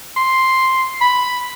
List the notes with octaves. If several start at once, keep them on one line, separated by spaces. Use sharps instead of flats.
C6
B5